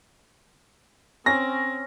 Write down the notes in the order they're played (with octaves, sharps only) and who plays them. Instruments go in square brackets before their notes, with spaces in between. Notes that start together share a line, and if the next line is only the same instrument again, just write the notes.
[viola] C4 [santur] C#4 [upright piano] A#6